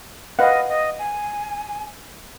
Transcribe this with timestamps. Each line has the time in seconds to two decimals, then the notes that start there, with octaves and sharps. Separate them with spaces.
0.39 B4 D#5 F5 F#5
0.69 D#5
0.99 G#5